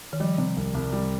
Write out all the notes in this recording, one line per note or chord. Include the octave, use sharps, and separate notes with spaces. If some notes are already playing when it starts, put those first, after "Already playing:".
D#3
F3 G3
C3
C2
C2
G3